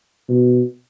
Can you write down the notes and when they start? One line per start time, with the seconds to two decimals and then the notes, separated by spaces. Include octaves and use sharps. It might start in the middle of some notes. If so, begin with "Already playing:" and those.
0.28 B2